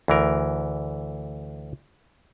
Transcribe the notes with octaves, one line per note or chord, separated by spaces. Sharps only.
D2 E3 A#4